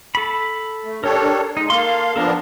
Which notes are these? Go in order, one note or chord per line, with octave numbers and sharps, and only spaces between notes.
A4 B5
A3
D4 G4 A4 A#4 C#5
G#3 D#4
A#3 A4 F5 C6
F3 B3 D4 A4 A#4